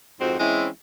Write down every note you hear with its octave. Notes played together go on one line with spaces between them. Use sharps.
F2 G#2 C4 F#4 C5
E3 G#3 C4 C#4 E4